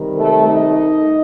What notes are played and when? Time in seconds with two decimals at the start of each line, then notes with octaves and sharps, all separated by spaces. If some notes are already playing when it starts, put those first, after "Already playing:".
Already playing: C3 D#3 G3
0.16 A3 A4
0.46 D#4 D#5